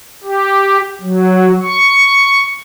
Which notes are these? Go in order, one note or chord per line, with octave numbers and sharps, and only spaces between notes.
G4
F#3
C#6